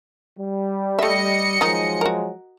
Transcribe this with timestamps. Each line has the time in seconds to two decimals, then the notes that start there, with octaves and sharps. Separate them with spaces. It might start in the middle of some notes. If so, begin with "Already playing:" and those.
0.38 G3
0.99 A3 D#5 E5 C#7
1.61 D#3 F3 F#3 G#3 D#4
2.01 F#4 A#4